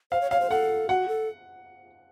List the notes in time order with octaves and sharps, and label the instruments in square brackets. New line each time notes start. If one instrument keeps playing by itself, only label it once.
[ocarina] C5 [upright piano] F5
[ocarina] C#5
[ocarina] C#5 [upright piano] F5
[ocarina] C5
[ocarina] A4 [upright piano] F#5
[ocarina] F#4 [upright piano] F#5
[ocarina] A4